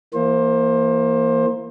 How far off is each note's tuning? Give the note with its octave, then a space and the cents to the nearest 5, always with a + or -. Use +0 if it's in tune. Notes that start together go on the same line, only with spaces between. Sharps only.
E3 +15 A#3 +0 C5 +25